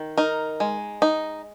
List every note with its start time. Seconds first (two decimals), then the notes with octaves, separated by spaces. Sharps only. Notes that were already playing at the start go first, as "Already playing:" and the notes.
Already playing: D#3
0.17 D#4 A#4
0.60 G#3
1.02 D#4